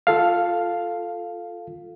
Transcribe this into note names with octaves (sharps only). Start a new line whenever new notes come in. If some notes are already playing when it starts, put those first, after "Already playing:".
F4 A4 F5